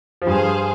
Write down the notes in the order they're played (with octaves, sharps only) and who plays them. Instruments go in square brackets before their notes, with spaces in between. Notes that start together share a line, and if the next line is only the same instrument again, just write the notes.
[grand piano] F3
[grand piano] G2 G3 [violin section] G#4 C5 F5 G#5